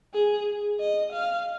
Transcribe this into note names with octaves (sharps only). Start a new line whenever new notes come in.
G#4
D#5
F5